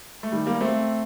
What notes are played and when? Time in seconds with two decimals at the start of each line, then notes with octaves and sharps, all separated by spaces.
0.23 A3
0.32 D#3 G3
0.46 G3 A#3
0.61 A3 C4